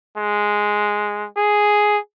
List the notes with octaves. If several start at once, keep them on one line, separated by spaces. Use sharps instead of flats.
G#3
G#4